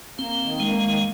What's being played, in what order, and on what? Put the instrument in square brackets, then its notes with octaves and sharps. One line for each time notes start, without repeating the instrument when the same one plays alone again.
[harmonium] A#3 [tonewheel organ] C4
[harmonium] D#3
[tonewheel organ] G#3 [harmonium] A#3
[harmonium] D#3